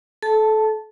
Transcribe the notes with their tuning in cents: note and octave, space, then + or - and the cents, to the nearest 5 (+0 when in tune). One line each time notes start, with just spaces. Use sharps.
A4 -25 A5 +0